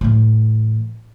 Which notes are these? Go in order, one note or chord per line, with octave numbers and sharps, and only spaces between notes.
A2 E3